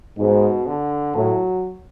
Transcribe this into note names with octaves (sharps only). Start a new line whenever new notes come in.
G#2 B2
D3
A2 F#3